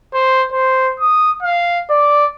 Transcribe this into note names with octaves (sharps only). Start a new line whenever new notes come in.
C5
C5
D#6
F5
D5